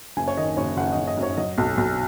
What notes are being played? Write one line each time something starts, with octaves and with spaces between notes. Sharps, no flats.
F#1 G#5
C#5
D#3 D#5
F#1 C#5
F#1 F#5
F#1 D#5
D#5
F#2
C#5
F#3 D#5
B1
B1